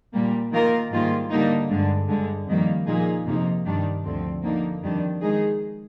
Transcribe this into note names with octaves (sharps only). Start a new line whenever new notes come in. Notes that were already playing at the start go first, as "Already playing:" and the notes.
A#2 G3 A#3
D#3 A#3 F4 A#4
G#2 D#3 G3 A#3 F4
D3 G3 A#3 D#4
G2 D3 G#3
G2 D3 G#3
F2 D#3 G3 A#3
A#2 F3 A#3 D#4 G#4
F2 C3 F3 A#3 D#4
G2 D#3 G3 D4
D2 D3 F3 C4
D3 F3 A#3 D#4
F2 D#3 G3 D4
D#3 G#3 D#4 G#4